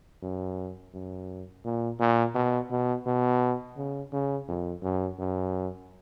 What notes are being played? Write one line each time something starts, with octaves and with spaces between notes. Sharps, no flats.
F#2
F#2
A#2
A#2
B2
B2
B2
C#3
C#3
F2
F#2
F#2